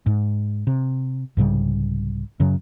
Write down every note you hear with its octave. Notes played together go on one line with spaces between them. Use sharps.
G#2
C3
C2 G#2 C#3 G3
F#2 C#3 F#3